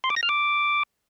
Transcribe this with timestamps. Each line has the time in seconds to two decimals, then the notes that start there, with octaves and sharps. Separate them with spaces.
0.04 C6
0.10 D6
0.16 A#6
0.23 F6
0.29 D6